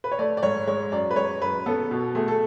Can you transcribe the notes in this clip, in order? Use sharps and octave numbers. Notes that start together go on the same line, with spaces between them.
B4
C#5
A3 D5
D5
G#2 C#5
G#3 C#5
F#2 D5
B4
G#3 C#5
F#2 B4
B3 A4
B2
A3 G#4
A4